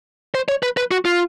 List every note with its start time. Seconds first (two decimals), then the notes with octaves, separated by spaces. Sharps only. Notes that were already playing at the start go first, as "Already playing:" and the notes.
0.35 C5
0.49 C#5
0.63 B4
0.77 B4
0.91 F#4
1.05 F4